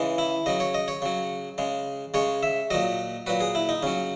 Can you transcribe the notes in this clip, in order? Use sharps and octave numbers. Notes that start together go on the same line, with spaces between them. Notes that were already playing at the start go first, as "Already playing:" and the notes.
Already playing: C#3 E3 G#3
E4
C#3 F#3 D#5
C#5
D#5
C#5
C#3 F#3
C#3 G#3
C#3 G#3 C#5
E5
A#2 F#3 D#5
A#2 F#3 B4
G#4
E4
D#4
C#3 F#3 C#4